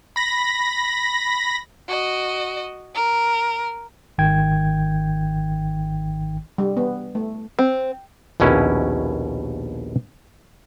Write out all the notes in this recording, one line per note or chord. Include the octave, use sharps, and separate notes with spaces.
B5 A#6
F#4 D#5
A#4
G#1 D#3 G5 G#6
G3
B3
A3
C4
A#1 D#2 B2 C#4 E4